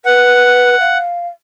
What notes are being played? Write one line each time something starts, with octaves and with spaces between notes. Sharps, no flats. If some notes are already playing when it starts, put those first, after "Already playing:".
B4 F#5
F5